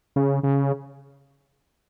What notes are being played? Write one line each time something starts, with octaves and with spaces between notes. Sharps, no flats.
C#3
C#3